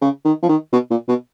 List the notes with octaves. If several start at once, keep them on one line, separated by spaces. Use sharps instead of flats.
C#3
D#3
F3
D#3
B2
A#2
B2